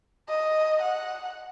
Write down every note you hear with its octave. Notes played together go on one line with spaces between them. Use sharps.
D#5
F#5